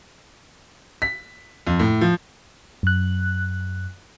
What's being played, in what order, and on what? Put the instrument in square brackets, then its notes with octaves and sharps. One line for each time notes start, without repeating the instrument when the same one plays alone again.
[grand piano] B6
F2
A2
F3
[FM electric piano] F#2 F#6